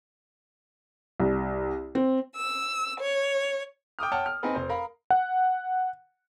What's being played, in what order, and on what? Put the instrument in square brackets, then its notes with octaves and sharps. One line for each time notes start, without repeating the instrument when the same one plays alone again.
[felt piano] C2
C4
[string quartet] E6
C#5
[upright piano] G5 D6 D#6 F6
C#5 F#5 G5 A5 F6
F6
C4 D#4 G#4 B4
F1 C5
A#4 F5 A#5 B5
[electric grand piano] F#5